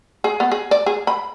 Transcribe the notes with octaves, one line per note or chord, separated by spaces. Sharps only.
G#4
B3
G#4
D5
G#4
B5